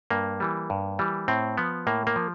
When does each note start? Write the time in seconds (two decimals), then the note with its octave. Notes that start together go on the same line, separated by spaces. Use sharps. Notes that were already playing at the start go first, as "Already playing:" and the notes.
0.10 G2 A#3
0.40 E3 G3
0.70 G2
0.99 E3 G3
1.28 A2 C4
1.57 F3 B3
1.87 A2 A#3
2.07 A#3
2.16 F3